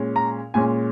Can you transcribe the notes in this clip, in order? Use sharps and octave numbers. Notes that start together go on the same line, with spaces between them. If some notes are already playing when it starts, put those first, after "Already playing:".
Already playing: A#2 G#3 C#4
A#5
A#2 G#3 C#4 G#5